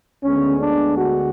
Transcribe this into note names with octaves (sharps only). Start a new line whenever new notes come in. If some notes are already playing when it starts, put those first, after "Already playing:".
D2 D3 G#3 B3 C#4
D4
F#4